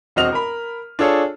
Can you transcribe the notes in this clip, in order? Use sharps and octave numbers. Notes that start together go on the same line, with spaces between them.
E1 C4 F#4 D#5 F6 F7
A#4 B5
D4 F4 G#4 A4 C#5